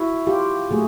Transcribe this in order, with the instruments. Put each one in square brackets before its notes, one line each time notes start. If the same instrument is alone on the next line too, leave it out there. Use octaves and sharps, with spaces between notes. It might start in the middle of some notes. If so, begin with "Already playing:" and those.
Already playing: [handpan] E4 F#4
F4 G4
A#2 F#3 A3 F#4 G#4